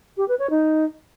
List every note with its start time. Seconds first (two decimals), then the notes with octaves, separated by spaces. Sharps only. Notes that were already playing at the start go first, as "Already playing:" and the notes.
0.17 G4
0.28 B4
0.39 C#5
0.50 D#4